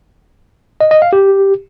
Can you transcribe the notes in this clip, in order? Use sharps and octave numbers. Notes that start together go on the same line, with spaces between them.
D#5
D#5
F5
G4